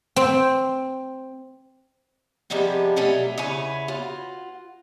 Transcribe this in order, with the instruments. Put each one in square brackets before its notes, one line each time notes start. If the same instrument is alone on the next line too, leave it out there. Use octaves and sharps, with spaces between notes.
[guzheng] C4
[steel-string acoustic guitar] C3 F3 G3 G#3 B3
B2 F#3 G3 A3 C#4
E2 C#3 B4 C#5 G#5
F4 F#4